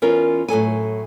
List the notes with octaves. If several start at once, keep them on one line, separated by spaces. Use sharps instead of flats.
E2 C#4 F4 A#4
A2 F#3 A4 G#5